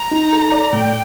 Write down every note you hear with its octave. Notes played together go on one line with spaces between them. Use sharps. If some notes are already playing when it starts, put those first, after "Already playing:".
Already playing: A#5
D#4
A4
D5
A2 G5